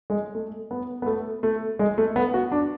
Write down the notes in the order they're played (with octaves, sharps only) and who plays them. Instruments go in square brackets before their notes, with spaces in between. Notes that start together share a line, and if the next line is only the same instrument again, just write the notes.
[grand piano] G#3
A3
B3
B3
A3
A3
G#3
A3
B3
F#4
D4